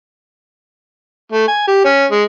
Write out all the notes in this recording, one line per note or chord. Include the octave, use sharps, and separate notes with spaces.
A3
G#5
G4
C#4
G#3